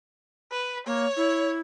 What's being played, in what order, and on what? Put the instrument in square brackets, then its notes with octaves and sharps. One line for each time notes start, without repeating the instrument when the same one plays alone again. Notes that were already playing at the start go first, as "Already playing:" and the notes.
[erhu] B4
[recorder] A#3 [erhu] C#5
[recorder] E4